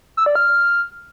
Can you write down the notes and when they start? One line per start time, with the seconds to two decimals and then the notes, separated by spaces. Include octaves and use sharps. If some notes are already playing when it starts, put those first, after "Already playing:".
0.17 E6
0.26 D5
0.35 F6